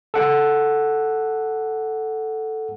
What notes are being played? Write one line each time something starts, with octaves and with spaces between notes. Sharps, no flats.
A4 F#5